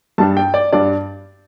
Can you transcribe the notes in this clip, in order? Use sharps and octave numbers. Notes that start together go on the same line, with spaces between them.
G2 G3 D4 A5
G5
D5
G2 G3 D4 D5